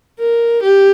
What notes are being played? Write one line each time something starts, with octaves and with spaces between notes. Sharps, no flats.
A#4
G4